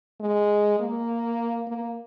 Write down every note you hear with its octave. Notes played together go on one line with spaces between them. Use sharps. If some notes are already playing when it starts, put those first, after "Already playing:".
G#3
A#3
A#3